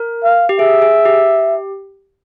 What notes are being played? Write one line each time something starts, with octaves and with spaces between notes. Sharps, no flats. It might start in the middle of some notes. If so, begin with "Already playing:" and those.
Already playing: A#4
F5
G4
G#4 E5
G#4
G4